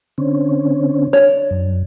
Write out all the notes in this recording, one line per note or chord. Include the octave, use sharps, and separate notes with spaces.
D3 C4 C#4
D4 C#5
F#2